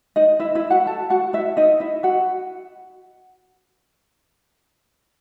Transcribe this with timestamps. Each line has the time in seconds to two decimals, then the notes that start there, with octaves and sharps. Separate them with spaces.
0.16 D#4 D#5
0.40 E4 E5
0.55 E4 E5
0.70 F#4 F#5
0.86 A4 A5
1.10 F#4 F#5
1.33 E4 E5
1.57 D#4 D#5
1.80 E4 E5
2.03 F#4 F#5